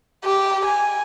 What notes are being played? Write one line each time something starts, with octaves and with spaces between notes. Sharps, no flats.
G4
G#5